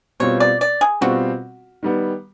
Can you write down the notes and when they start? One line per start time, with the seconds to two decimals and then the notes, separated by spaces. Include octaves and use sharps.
0.20 B2 G3 C4 F4 C#5
0.40 D5
0.61 D5
0.81 G#4
1.01 B2 G3 C4 F4 F#4
1.83 D#3 G3 B3